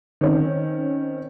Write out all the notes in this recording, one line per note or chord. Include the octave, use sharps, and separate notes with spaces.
D#3 C4 C#4